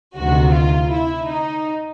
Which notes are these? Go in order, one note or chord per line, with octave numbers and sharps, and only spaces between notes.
D2 C3 D#3 F#4
F4
E4
D#4